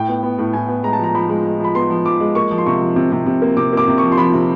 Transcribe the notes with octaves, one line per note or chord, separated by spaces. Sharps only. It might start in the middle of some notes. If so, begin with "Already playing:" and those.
Already playing: A2 G5
B3
B3
A2
A2 G#5
B3
G#3 A#5
A5
F3 A#5
F3 B5
G#3
G#3
F3 B5
B3 C6
F3
F3 D6
G#3
A#3 C#6
F3
C6
C3 C#6
F3
C3
C3
C3
A#3
C3 D6
A#3 D6
C3
F3 C#6
C6
F3 B5
C3